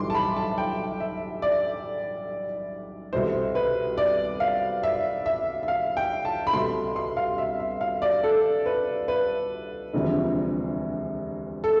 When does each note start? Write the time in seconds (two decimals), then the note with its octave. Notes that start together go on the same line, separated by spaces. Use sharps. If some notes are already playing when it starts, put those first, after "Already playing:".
Already playing: B1 A2 E3 G3 C6 D6
0.10 A5
0.15 B5
0.37 A5
0.58 G5
1.00 E5
1.42 D5
3.13 C2 B2 A3 C5
3.55 B4
3.98 D5
4.40 F5
4.83 E5
5.26 E5
5.63 E5
5.68 F5
5.97 G5
6.25 A5
6.47 B5
6.53 C2 B2 A3 C6
6.96 C6
7.17 F5
7.38 E5
7.60 E5
7.81 F5
8.02 D5
8.24 A4
8.66 B4
9.08 B4
9.94 E1 D2 C3 F3
11.64 A4